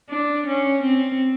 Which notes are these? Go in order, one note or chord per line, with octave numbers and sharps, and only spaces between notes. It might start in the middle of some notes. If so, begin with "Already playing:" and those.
D4
C#4
C4